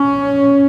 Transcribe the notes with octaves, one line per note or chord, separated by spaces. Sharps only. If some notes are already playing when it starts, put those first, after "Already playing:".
Already playing: C#4